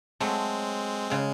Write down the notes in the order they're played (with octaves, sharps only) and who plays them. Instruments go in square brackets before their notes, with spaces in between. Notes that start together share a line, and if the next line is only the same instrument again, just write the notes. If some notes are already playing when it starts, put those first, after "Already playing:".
[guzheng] F#3 A3 [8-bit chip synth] G#3 C4
[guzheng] C#3 [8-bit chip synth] G#3